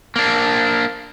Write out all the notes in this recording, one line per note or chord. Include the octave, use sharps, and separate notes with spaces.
A#3 D4